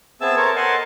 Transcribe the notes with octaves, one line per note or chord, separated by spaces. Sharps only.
B3 C4 G#4 E5 A5 E6
A4 A#4 C5 C#5 A5
A#4 D#5 F#5 G#5 A5 C6